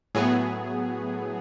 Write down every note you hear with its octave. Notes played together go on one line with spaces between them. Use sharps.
A2 F#3 B3 G#4